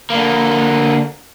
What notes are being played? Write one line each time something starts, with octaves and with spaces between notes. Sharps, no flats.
D3 A#3